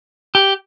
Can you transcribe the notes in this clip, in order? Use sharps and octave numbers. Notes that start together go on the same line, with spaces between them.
G4